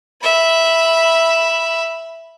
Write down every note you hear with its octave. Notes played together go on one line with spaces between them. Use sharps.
E5 B5